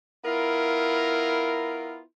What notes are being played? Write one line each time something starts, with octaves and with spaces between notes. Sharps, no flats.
B3 E4 F4 A#4